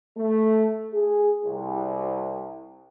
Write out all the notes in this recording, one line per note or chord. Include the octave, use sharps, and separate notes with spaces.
A3
G#4
C2